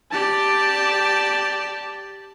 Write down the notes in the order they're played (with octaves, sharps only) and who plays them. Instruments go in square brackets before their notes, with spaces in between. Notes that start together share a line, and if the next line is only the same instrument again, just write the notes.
[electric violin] G4 D5 [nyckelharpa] A5